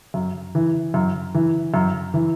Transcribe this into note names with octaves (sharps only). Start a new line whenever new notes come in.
F#2
E3
F#2
E3
F#2
E3